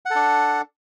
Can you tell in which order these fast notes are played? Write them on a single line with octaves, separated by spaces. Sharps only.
F#5 A4 D4